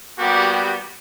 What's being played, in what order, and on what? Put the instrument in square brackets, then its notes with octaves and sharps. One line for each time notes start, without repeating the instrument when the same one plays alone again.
[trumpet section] G3 A#3 B3 F#4 G4